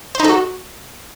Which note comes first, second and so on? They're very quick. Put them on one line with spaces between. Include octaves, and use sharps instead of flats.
C5 D#4 A4 F#4